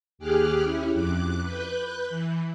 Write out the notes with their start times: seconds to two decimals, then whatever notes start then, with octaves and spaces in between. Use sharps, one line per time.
0.18 D#2 G4 G#4 D6 F6 F#6
0.63 C#4 E4
0.92 F2 D6 F#6
1.42 B4 F#6 G6
2.09 E3